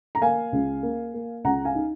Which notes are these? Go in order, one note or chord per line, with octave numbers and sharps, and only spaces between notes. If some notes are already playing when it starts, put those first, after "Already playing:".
A#5
A#3 F5 G#5
C#2
A#3
A#3
C#2 F#5 A#5
F5 G#5
D#4